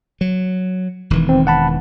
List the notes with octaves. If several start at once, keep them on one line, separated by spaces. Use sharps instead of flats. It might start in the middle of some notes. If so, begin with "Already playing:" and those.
F#3
E1 D#3 E3
C4
F#5 A5 B5